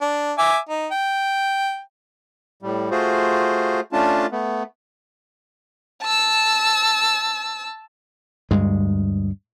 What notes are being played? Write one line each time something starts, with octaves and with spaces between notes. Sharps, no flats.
D4
E5 G#5 D6
D#4
G5
A2 G3
A3 F4 F#4 G#4 C5
A3 C#4 D4 F4 A5
A3 B3
A5 E6
D2 G2 G#3